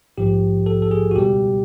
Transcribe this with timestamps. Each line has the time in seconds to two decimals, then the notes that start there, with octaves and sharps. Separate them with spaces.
0.18 A#1 G#2 F3 G4
0.66 A4
0.82 A4
0.91 G#4
1.11 F#4
1.16 C#2 B2 G3 G4